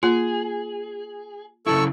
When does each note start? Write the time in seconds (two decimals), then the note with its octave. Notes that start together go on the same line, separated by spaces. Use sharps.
0.03 A#3 F4 G#4
1.67 C#3 F#3 E4 A4 C#6 E6